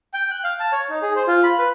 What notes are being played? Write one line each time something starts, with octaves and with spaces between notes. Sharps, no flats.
G5
F#6
F5
A5
C#5
D#4
G#4
C5
F4
B5
B4